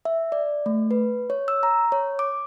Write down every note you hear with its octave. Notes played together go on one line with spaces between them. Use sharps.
E5
D5
A3
B4
C#5
E6
A#5
C#5
D6